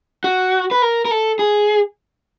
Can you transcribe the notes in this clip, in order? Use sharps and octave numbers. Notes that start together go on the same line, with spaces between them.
F#4
B4
A#4
A#4
A4
G#4